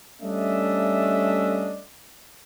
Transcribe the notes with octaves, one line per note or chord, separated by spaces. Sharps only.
G3 A3 C#4 D4 D#5 E5